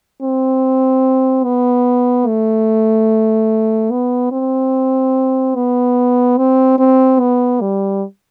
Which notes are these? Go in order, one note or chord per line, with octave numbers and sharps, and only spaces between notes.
C4
B3
A3
B3
C4
B3
C4
C4
B3
G3